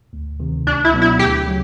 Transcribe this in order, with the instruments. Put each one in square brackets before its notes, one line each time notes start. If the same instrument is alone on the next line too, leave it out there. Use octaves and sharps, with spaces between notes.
[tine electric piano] D2
C3 D#3
[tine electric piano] C#2 [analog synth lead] D4
[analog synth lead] E4
[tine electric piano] B2 F#3 B3 D4
[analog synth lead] E4
[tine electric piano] D2 [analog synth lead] G4
[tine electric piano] C#3 F#3